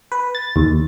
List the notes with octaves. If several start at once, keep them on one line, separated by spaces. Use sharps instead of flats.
B4
A6
D#2